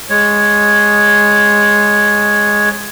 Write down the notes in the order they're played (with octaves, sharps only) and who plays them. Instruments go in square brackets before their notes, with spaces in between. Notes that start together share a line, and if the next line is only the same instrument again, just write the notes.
[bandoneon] G#3 C#5